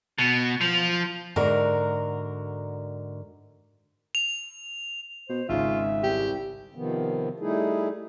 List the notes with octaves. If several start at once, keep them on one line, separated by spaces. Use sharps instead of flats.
B2
F3
G#2 D3 F#4 A#4
F7
B2 C5
G#1 G#2 C#3 F4 E5
C2 G4
C3 D#3 F3 B3
G3 A3 D#4 E4 G#4